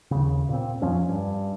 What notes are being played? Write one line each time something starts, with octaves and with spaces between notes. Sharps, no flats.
D#2 C#3
A#2 C4
F2 F3 C#4
G2